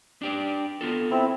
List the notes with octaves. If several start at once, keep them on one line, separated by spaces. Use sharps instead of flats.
D4 G4 D5
B3 F4 A4
C4 E4